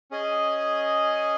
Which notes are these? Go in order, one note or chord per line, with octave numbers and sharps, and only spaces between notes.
C#4 G#4 D#5 G#5